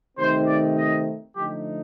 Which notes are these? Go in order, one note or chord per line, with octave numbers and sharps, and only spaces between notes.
C3 D#3 A3 C4 D#4 C5
D5
D#5
D3 F3 A3 D#4 G4